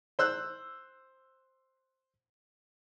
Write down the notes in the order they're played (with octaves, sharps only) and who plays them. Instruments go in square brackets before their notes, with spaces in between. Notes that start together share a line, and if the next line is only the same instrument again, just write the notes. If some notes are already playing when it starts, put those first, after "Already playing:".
[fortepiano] C5 E6 F#6